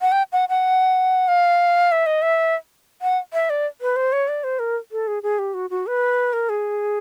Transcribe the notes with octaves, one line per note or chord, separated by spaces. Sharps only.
F#5
G5
F#5
F#5
F5
E5
D#5
E5
F#5
E5
D5
B4
C5
C#5
D5
C5
A#4
A4
G#4
G#4
G4
F#4
F#4
B4
A#4
G#4